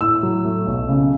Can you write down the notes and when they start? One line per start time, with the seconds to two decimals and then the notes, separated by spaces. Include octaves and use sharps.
0.01 A2 E6
0.23 F#3
0.45 A3
0.67 B1
0.88 C#3